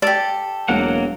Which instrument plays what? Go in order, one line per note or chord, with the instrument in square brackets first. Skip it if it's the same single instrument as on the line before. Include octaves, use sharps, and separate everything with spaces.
[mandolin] G4 A4 [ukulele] D5
[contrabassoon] E1 [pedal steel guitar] F#3 A#3 F#5